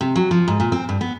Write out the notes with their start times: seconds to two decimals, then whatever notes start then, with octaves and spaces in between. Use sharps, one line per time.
0.01 C3
0.16 F#3
0.31 F3
0.48 G#2
0.60 A#2
0.72 C4
0.89 G2
1.01 B3